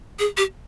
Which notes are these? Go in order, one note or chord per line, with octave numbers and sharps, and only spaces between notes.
G#4
G4